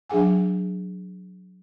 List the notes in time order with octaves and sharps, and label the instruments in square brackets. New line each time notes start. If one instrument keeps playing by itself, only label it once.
[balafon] F#3 D4 G#4 F#5 G#5